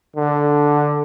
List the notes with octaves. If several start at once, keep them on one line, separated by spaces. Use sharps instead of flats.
D3